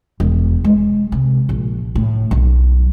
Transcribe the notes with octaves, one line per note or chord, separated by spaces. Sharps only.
E1
G#3
C3
A#1
A2
B1